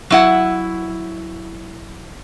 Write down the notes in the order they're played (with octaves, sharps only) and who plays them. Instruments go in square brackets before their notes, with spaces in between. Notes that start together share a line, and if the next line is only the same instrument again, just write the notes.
[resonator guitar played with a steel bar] F#3 E4 F#5